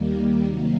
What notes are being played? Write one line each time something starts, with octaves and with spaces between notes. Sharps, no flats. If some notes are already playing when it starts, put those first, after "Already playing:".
Already playing: D#2 D#3 G3 A#3
C3 D#3 F#3 A#3